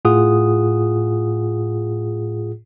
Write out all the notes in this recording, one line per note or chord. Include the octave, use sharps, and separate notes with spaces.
A2 F4 G#4 F#5 D#6